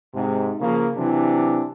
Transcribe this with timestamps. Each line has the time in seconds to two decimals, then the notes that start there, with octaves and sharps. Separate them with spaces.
0.14 G#2 C3
0.61 C#3 F3 A#3
0.96 C3 E3 F#3 D4